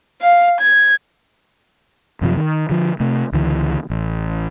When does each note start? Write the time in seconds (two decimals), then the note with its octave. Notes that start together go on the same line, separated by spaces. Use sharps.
0.21 F5
0.60 G#6
2.21 F#2 C3 F3
2.37 D#3
2.69 D3 F3
3.00 C3 A3
3.32 C#2 D3 E3
3.90 A1